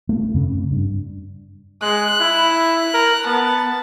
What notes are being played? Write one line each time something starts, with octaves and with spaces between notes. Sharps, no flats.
A3
F#2 C#3 C4 C#4
G2
G#3 F#6
E4
A#4
B3 A5